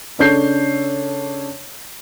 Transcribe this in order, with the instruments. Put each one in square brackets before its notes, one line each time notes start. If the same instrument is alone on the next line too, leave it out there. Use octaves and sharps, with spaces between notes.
[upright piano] C#3 D4 A4 C#5 G6 C7